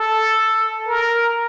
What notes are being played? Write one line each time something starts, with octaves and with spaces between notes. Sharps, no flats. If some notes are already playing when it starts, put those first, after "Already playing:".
Already playing: A4
A#4